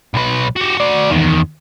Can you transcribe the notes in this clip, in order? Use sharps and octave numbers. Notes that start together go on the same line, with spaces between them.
B1 B4
F#4 G4
F#4 D5
E2 D#3